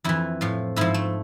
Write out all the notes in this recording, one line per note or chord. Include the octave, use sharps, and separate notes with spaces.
F2 E3 E4
A2 F3
G#2 F3 E4
A3